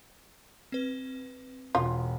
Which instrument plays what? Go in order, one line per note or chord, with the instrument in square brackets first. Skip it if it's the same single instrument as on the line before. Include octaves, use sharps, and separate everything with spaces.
[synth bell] C4 B4
[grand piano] E1 [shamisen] F4